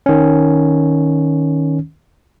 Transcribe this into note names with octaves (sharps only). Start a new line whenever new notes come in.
D#3 C#4